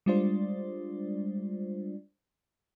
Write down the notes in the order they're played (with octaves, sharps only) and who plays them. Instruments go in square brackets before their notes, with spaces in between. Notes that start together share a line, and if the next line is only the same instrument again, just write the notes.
[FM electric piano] G3 G#3 D4 F4 C5 D5